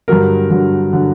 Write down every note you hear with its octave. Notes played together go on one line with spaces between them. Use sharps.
G2 D3 F#3 A#4
G2 D3 F#3
D3 F#3